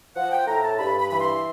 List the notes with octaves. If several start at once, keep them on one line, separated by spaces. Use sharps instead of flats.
F3 F#5
G5
A2 A#5
A5
G2 B5
B5
E3 B5
C6